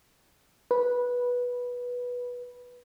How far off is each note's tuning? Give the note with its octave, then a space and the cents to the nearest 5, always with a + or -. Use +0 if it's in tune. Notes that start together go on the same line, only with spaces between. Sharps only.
B4 -10